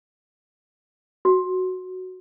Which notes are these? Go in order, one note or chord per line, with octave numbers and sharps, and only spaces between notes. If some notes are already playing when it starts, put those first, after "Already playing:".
F#4